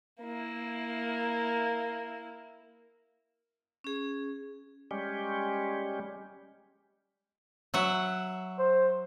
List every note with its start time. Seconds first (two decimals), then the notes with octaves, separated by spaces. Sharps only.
0.21 A#3 E4
3.84 C#4 G#4
4.91 G3 G#3 C#4 G4
7.74 F#3 E5 F#5
8.59 C5